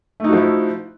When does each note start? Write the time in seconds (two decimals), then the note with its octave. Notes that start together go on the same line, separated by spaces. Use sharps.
0.20 A3
0.24 D#4
0.28 F#4
0.33 F3
0.37 E4